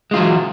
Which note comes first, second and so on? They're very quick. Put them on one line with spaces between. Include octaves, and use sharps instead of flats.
G#3 F4 F#3 E3